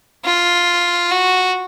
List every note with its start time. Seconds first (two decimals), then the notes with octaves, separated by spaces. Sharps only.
0.25 F4
1.11 F#4